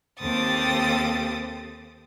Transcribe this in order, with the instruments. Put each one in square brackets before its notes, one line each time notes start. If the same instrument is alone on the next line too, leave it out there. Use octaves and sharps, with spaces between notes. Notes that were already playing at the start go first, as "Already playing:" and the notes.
[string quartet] D#2 C4 G4 A4 D#6 A6